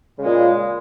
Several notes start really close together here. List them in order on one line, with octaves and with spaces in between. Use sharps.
C#3 G#3 A#2